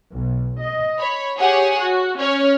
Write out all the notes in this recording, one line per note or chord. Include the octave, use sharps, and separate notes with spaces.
B1
D#5
C#5 B5
G4 G#4 C#5 F#5 G#5
F#4
C#4 C#5 F6